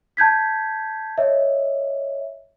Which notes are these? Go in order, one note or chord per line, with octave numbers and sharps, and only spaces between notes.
A5 G6 G#6 B6
C#5 D#5 E5